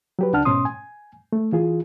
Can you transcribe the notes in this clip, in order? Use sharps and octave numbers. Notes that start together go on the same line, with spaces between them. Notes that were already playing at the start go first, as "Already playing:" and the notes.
F#3 G4 B4
C#2 D4 F#5 A5 F6
G#2 B2 C#4 C6 D#6
G#5
A3
E3 F4 G#4